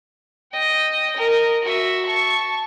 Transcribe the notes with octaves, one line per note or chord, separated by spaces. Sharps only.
D#5 G5
A#4 D#5
F#4 E5
A5 C#6